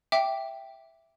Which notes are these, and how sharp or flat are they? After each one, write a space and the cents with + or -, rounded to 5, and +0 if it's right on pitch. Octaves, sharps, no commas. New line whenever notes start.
E5 +0 G5 +0 D6 -5